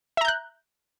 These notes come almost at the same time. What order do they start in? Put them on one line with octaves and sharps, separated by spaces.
E5 A#5 G6 F#6